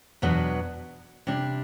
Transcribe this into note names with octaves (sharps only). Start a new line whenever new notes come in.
E2 B2 F#3 B3 D4
C3 G3 D4